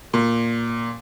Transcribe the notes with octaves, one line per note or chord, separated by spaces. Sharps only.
A#2